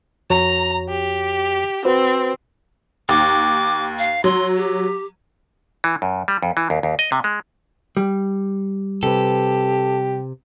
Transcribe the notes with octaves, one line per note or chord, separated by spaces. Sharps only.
F2 F#4 C#5 A#5
G4
C4 F#4 B4 C5
D#2 D6
F5
F#3 C6
G4
E3
F#2
G3
F2
E3
D#2
D#2
D#5
C3
G#3
G3
C3 G4 A4 B4